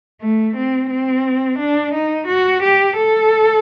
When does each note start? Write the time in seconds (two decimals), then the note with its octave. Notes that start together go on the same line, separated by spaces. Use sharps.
0.22 A3
0.56 C4
0.90 C4
1.59 D4
1.94 D#4
2.27 F#4
2.63 G4
2.97 A4